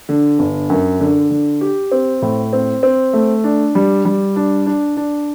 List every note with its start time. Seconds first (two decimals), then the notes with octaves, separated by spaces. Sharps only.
0.09 D3
0.39 G1
0.70 F#2
1.00 D3
1.30 D3
1.61 G4
1.91 C4
2.22 A2
2.53 C4
2.83 C4
3.13 A3
3.44 D4
3.75 G3
4.05 G3
4.36 D4
4.66 D4
4.97 D4